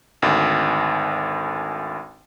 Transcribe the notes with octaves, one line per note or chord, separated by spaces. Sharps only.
G#1 D2